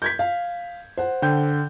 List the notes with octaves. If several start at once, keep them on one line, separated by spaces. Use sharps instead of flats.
G6 G#6 B6
F5
C5 F#5
D3 G5 G6